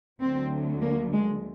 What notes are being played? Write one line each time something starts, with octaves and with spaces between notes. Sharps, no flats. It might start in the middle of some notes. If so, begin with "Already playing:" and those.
D2 D3 F#3 C4
A#3
G#3